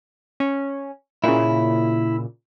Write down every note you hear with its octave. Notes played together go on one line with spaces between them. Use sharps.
C#4
A#2 C#3 E4